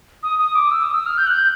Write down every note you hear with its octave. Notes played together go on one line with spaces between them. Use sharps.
D#6
D#6
D6
E6
D#6
E6
F6
G6
F#6
G6